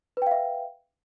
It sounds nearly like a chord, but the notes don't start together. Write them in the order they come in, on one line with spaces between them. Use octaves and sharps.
B4 G5 F5 E5